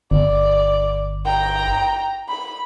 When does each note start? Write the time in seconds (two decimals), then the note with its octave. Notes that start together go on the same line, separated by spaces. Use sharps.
0.11 G1 D5
1.25 G5 A#5
2.29 B5